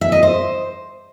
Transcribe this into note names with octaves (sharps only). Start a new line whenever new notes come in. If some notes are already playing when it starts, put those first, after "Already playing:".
E5
D#5
C5